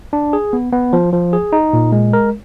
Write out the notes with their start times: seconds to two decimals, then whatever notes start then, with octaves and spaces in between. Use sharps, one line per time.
0.13 D4
0.33 G#4
0.53 B3
0.72 B3
0.93 F3
1.13 F3
1.33 G#4
1.53 D#4
1.73 A#2
1.92 G#3
2.13 A#4